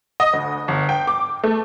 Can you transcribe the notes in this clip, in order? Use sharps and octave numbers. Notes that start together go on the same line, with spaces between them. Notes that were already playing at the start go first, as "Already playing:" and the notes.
D#5
D2
G1
G5
D6
A3